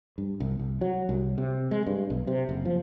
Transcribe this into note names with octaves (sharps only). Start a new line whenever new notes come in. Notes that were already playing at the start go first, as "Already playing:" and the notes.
G2
C2
C2
F#3
C2
C3
G#3
G2
B1
C3
F#1
F3